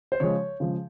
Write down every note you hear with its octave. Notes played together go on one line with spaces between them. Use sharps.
C5
C#3 F3 G#3 C#5
C#3 F3 G#3